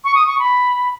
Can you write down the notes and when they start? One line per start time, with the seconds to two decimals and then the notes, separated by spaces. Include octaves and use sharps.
0.04 C#6
0.15 D#6
0.27 C#6
0.40 B5